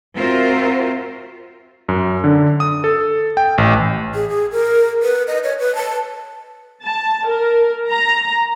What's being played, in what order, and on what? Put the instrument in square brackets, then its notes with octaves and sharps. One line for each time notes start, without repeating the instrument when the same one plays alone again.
[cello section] C4 F4 F#4 A#4 C5 E5
[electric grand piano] F#2
D3
D#6
A4
G5
A1
[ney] G#4
G#4
A#4
B4
D#5
C#5
B4
A5
[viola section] A5
A#4
A#5